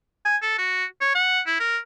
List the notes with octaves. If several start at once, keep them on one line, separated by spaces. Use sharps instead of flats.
G#5
A4
F#4
C#5
F#5
E4
A#4